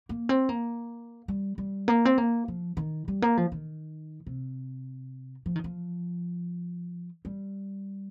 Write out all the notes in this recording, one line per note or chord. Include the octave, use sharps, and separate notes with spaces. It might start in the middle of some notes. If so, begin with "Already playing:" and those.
A#3
C4
A#3
G3
G3
A#3
C4
A#3
F3
D#3
G3
A#3
F3
D#3
C3
F3
D#3
F3
G3